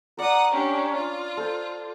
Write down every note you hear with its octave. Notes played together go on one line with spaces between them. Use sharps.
A#4 D5 F#5 A#5 D#6
C#4 D4 G4
F4
A4 C5